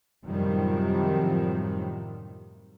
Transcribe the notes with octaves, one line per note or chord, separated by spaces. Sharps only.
F#2 A2 C3 D#3 F3 G3